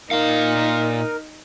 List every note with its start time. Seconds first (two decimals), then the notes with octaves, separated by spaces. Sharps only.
0.11 A#2 D#4 A#4 F5